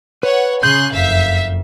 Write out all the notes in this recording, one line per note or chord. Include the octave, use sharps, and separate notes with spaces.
B4 C#5 F#5
C#3 G#4 C6 F#6 G6
F#1 F2 E5 F5 B6